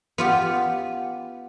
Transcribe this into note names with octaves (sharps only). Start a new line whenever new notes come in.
B3 F4 G4